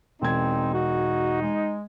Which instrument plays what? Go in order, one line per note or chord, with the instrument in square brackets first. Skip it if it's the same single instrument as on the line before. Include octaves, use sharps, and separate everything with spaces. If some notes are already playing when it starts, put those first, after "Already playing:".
[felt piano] E1 G#6 [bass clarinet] C4 [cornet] D#4
[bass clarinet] F#4
G#3